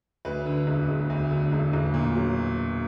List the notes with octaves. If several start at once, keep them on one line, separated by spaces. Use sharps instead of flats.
D2 B4
D3
E1
E1
D2
D3
E1
E1
A#2
F#3